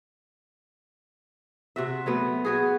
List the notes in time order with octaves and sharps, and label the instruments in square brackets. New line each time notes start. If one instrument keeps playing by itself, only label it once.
[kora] C3 F#4 E5
F#3 A3 B3
B3 F#4 G#4